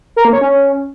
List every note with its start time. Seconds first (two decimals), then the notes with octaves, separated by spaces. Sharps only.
0.16 A#4
0.25 A#3
0.33 C#5
0.41 C#4